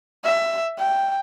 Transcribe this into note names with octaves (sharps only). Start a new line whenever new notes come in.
E5
G5